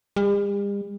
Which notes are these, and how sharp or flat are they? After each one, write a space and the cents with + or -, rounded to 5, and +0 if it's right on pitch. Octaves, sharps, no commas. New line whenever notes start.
G3 +45